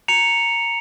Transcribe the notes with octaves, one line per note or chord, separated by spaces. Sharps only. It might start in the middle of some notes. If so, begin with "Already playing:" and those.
A#5 C#7 F7